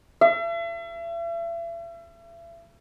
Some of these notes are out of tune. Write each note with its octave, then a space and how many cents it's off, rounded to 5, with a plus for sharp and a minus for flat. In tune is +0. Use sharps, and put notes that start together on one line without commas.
E5 +40